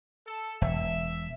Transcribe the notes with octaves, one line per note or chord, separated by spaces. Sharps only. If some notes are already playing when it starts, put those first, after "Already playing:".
A4
E1 E5